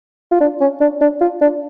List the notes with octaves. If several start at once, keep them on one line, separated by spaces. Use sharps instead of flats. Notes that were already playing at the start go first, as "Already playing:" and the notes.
F4
D4
C#4
D4
D4
F4
D4